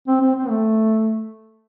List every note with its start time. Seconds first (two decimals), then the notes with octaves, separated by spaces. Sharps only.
0.08 C4
0.21 C4
0.36 C4
0.49 A3